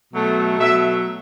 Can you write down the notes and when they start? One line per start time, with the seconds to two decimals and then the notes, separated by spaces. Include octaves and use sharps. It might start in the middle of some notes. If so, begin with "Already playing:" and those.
0.13 B2 F#3 A3
0.58 B2 F#3 A3 E5